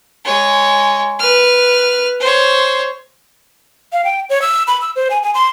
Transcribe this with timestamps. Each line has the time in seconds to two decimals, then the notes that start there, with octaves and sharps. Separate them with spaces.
0.25 G#3 C#5
1.19 B4 F6
2.20 C5 C#5
3.93 F5
4.04 G5
4.30 C#5
4.42 E6
4.67 B5
4.81 E6
4.96 C5
5.10 G#5
5.23 G#5
5.34 C6